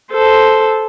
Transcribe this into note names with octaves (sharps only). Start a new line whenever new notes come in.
A4 C5